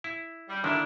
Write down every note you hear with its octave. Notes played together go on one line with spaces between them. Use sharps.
E4
G3
D3 D#3 A#3 D4 E4